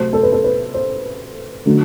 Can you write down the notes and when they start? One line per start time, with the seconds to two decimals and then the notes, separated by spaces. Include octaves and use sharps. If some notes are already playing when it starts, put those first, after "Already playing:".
Already playing: C3 F#3 A3 C5
0.13 A4
0.23 B4
0.32 A4
0.44 B4
0.74 C5
1.66 D3 F#3 A3